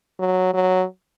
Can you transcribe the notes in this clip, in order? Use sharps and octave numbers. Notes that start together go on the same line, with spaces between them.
F#3
F#3